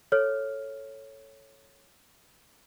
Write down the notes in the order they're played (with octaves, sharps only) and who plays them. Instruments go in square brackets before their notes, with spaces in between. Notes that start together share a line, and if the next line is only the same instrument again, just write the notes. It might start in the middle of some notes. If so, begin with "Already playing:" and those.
[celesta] A4 C#5 F6